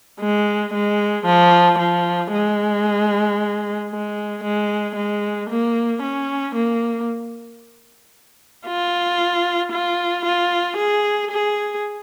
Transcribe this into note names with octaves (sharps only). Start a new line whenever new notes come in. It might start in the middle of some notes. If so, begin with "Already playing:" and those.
G#3
G#3
F3
F3
G#3
G#3
G#3
G#3
A#3
C#4
A#3
F4
F4
F4
G#4
G#4